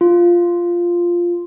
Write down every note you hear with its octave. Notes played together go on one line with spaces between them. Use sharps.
F4